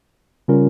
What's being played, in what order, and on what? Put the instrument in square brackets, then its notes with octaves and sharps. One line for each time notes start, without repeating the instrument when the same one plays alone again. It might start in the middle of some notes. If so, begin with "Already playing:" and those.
[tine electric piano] C#3 G3 C#4 F4 A#4